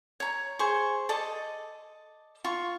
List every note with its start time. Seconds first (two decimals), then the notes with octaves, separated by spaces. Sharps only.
0.20 C#5 A#5
0.59 G#4 C5 C#6
1.09 A4 D5 D#5
2.44 F4 C#6